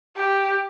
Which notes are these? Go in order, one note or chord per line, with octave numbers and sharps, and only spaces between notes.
G4